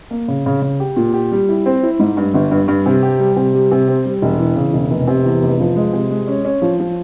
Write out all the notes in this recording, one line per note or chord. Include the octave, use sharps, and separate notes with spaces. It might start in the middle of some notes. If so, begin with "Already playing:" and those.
A#3
C#3
C#3
C#3
G4
A#2
G4
G3
E4
C4
E4
G#2
G2
G1
G2
G2
C3
G4
G3
C3
G3
C3
C4
G3
E1
E3
C#3
E1
F1
C3
E2
F1
F3
G#3
C3
G#3
C#4
C#4
F3
F3